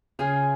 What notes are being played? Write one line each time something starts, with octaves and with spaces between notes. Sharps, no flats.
C#3 F4 G#4 D#5 G#5